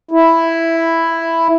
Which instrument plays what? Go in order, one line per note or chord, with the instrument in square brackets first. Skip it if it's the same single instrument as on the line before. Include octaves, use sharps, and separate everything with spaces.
[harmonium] E4